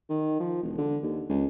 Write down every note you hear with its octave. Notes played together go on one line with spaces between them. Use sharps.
D#3
F3
E1
D3
D#2
C#2